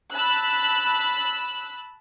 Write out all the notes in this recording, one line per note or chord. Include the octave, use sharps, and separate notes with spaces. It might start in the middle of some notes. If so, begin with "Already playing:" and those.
A5 B5 E6 F#6